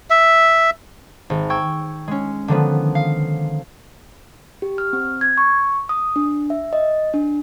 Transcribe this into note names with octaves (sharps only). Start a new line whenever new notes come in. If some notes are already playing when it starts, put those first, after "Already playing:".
E5
G#1
G5 C#6 E6 G#6
G#3 C#4
D3 D#3 F3 B3
F5
G4
F6
C4
G#6
C#6
D#6
D4
E5
D#5
D4